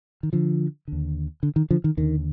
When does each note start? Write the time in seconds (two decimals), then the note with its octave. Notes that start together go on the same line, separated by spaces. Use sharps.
0.23 D#3
0.33 D3 F3
0.88 D#2 D3
1.43 D3
1.56 D#3
1.71 D3 F3
1.84 D#3
1.97 D#2 D3 D#3